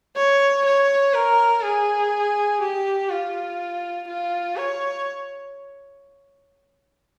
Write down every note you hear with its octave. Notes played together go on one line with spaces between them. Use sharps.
C#5
C#5
A#4
G#4
G4
F4
F4
C#5